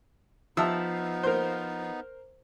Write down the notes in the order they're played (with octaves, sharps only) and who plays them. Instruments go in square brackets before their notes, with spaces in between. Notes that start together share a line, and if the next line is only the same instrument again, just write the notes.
[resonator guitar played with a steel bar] F3 [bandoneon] B3 D#4 [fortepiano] E5 A5 E6
[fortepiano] A#4 C5